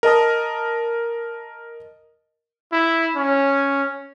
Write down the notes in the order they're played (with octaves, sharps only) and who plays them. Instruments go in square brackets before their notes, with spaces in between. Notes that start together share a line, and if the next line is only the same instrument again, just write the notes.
[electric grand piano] A#4 D#5 A5 D#6
[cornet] E4
C#4